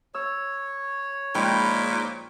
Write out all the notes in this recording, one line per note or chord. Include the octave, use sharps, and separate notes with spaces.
C#5 E6
A#2 F3 G#3 D#4 G5 B5 G6